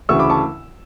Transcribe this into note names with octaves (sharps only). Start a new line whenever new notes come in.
D2 C#3 E3 C#6 E6
B5 D6
A5 C#6